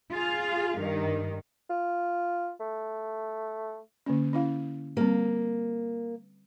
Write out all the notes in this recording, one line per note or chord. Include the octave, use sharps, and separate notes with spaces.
F4 G#4 F5
G2 D#3
F4
A3
D3 A#3 C#4
C#4 E4 F5
G3 A#3 C4